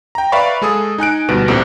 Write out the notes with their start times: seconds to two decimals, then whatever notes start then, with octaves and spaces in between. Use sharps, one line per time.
0.15 G5 A#5
0.32 B4 D5 E5 F5 B5 C#6
0.62 G#3 G#4 A4 D#6
0.98 D#4 G#5 F#6 D7
1.29 D2 B2 G3 B4 D7
1.48 A#1 A2 C3 A#3 D7